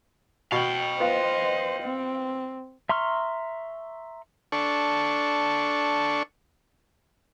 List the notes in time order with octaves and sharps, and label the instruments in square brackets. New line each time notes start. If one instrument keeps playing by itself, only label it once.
[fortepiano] B2 [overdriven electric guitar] F5 G5
[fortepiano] B3 F4 [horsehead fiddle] C5 D#5
[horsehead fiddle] C4
[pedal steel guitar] E5 A#5 C6 C#6 F6
[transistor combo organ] D4 A4 C#6